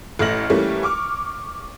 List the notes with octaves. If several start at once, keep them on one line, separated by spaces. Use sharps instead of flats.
A1 A3 F6 A#6 F#7
E3 G3 A3 A#3 C#4
C#6 D6 F6